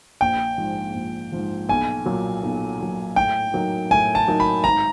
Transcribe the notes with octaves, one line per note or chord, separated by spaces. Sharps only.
A#1 G5
G#2 F3
A#1
G#2 F3
B1 G#5
A#2 F#3
B1
A#2 F#3
A2 G5
F#3 A#3 D#4
A2 G#5
A5
F#3 A#3 D#4
B5
G#1 A#5